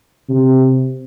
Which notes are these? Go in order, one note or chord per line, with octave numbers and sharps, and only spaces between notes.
C3